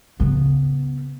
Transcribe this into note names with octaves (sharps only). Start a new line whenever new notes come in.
C#3 B3